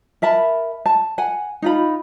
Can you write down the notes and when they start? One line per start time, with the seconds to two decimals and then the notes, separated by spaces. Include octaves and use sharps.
0.22 A#4 E5 A5 B5
0.86 A5
1.18 F#5 G#5
1.62 D#4 F4 B5